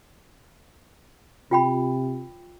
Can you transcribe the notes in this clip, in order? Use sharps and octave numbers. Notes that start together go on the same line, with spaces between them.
C3 F4 G5 B5